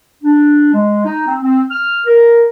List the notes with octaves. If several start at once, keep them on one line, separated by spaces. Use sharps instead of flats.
D4
G#3
D#4
C4
C4
F6
A#4